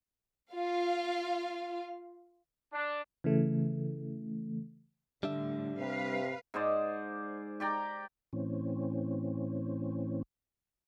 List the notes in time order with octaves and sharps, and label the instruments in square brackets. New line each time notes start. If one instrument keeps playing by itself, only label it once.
[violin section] F4 F5
[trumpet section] D4
[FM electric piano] C#3 E3 A3
[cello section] A2 D3 [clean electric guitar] G3 D4 E5
[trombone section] C3 [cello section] B4 F5
[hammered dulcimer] G#2 G#4 C5 D5
G4 D5 G5 A#5
[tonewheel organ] A2 E3 C4 C#4